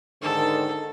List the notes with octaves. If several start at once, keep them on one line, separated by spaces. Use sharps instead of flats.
G#2 D3 D#3 A4